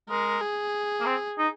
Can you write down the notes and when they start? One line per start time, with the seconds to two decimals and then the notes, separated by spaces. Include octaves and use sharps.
0.10 G#3 A#4
0.42 G#4
1.00 A#3
1.06 C4
1.38 D#4